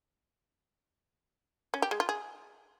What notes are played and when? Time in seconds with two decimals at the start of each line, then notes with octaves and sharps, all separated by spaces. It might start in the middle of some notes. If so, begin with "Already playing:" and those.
1.74 C#4
1.82 G4
1.91 G#3
2.00 F4
2.09 G#4